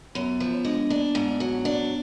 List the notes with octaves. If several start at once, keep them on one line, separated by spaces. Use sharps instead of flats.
F#2 B3
F3
G#3 D4
A#3 D4
G#2 B3
F#3
D4